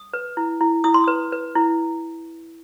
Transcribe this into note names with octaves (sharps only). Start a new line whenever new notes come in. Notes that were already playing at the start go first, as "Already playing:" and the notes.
Already playing: D#6
B4
E4
E4
E4 D#6
C6
B4 D#6
B4
E4